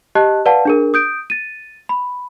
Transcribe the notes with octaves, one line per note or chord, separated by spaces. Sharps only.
G4 D#5 A5 F#6
B4 D5 F5 F#5 A5
D4 G#4 A#4
D#6 G6 D7
A6 D#7
B5